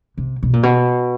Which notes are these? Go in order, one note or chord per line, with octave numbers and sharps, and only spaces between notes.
C3
B2
A#2
B2